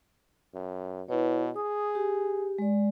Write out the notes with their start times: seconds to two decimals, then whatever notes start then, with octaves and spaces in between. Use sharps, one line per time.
0.54 F#2
1.09 B2 E4 B4 C#5
1.56 G#4 D#6
1.95 G4
2.58 G#3 D5